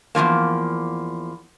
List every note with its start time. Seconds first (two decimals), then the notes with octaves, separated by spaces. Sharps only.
0.15 E2 B2 F3 A#3